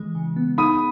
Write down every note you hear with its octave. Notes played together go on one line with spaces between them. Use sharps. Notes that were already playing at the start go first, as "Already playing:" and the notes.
Already playing: E3 G#3 G#4
C#3
B3
D#4 B5 D#6